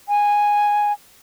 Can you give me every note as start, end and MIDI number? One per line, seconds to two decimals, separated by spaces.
0.09 0.92 80